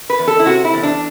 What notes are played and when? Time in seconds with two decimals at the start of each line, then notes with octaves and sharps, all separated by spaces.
0.10 B4
0.19 E2
0.27 A4
0.39 E4
0.46 C3 F#4
0.65 E4
0.74 E2
0.83 D4